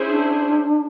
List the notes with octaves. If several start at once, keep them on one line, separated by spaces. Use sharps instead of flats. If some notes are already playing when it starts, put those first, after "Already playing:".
Already playing: C#4 E4 G#4 C5
D4